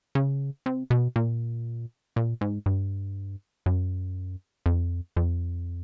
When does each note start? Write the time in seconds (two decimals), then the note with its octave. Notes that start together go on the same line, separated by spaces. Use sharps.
0.15 C#3
0.66 C3
0.90 B2
1.16 A#2
2.16 A#2
2.41 G#2
2.66 G2
3.66 F#2
4.66 F2
5.17 F2